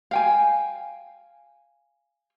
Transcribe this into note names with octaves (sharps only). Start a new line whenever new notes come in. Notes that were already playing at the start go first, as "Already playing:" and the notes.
F5 G5 G#5